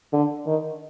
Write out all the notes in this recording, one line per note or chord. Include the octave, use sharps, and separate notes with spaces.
D3
D#3